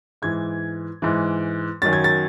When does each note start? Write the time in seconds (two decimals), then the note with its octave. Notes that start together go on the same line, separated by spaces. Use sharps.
0.22 G#2 E3 G#6
1.02 G#2 E3
1.82 F#2 D#3 F#3 A6
1.93 G#6
2.04 A6